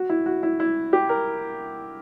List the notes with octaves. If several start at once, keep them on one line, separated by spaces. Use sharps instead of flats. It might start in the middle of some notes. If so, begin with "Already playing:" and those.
Already playing: F#4
E4
F#4
E4
E4
G4
A#4